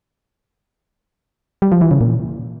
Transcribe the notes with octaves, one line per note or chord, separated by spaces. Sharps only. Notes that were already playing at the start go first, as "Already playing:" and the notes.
G3
F3
E3
C#3
A#2